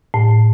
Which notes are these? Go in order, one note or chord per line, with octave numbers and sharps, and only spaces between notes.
A2